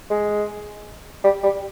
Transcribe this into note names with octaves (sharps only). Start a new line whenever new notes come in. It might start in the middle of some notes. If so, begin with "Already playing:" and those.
G#3
G3
G3